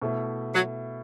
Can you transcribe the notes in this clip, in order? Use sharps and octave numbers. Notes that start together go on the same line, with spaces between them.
B2 A3 E4
F#3